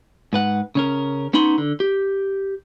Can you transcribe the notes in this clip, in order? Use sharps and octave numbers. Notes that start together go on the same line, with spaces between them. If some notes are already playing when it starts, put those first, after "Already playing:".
G#2 B4 F#5
C#3 C#4 A#4
B3 C#4 D#4 B5 C6
D3
G4